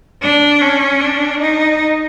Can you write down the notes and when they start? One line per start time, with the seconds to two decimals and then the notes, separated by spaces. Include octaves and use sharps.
0.22 D4
0.61 C#4
1.00 D4
1.40 D#4